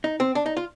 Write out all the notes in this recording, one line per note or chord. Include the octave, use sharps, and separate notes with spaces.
D#4
C4
D4
D#4
F4